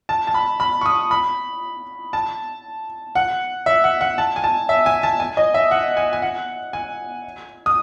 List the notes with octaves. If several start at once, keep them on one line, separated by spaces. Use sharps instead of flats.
A5
A5
B5
B5
C#6
D#6
B5
A5
F#5
E5
F#5
F#5
A5
G#5
A5
E5
G#5
A5
G#5
D#5
E5
F#5
G#5
G#5
F#5
G#5
D#6